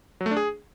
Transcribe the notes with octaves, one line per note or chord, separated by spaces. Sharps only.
F#3
A3
D4
G#4